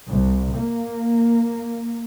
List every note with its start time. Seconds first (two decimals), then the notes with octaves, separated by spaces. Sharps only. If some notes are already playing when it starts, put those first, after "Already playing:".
0.11 C2
0.56 A#3